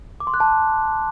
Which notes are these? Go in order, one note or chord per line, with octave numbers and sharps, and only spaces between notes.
D6
C6
F#6
A5